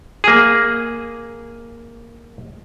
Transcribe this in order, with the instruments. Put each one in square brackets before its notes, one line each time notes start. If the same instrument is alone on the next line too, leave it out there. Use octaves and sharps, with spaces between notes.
[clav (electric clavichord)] A#3 G#4